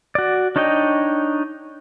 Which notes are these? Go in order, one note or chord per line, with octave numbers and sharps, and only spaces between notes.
F#4 D5
D4 D#4 C#5 D#5 G5